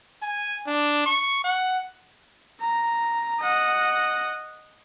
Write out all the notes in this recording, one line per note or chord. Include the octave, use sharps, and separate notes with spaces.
G#5
D4
C#6
F#5
A#5
D#5 F#5